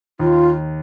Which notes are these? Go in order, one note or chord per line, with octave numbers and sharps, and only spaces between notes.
D#2 F4